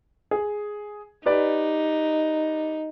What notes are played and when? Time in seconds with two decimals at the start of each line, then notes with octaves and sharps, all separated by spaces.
0.31 G#4
1.26 D#4 G4 B4 D5